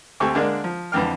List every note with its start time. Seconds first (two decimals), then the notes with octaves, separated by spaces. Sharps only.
0.20 D2 C4 G4 A4 G#5 C#6
0.35 D3 G#3 A#3 D4
0.64 F3
0.92 F2 D3 E3 G5 F6